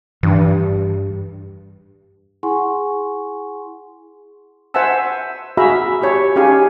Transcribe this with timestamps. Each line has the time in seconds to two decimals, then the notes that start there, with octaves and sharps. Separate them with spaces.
0.23 G2 E3 C#4 D4
2.43 E4 G#4 F#5 G#5 C6 C#6
4.74 C5 E5 F#5 G#5 A5 E6
5.57 F#4 G#4 E5 F5 A#5 B5
6.02 E4 G4 C#5 A5
6.36 C#4 D#4 G4 G#4 F5 G#5